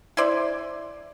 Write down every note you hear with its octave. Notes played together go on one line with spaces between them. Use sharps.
E4 C5 D5